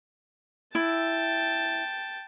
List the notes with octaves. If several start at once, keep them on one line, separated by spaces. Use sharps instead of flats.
E4 G5 A5